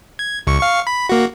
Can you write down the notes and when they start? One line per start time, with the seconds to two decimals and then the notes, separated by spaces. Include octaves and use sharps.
0.19 G#6
0.47 C#2 C#6
0.60 F5 C#6
0.87 B5
1.09 A#3 F#4